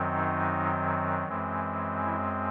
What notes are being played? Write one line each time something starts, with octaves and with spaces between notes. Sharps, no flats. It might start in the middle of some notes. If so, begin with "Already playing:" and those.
Already playing: F#2 D#3 F#3 C4
D#4
F#2 E3 G#3 C4
E3 E4